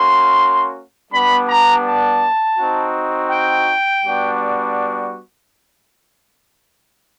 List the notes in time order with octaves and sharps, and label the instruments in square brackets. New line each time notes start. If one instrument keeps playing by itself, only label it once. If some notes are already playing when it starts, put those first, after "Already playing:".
Already playing: [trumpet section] A#3 C#4 F#4 C6
G3 B3 D4 B5
A#5
A5
C4 D#4 F#4
G5
G3 B3 D4 F#4